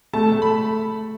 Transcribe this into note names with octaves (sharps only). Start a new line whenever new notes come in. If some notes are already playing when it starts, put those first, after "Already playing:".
A3 A5
A3
B5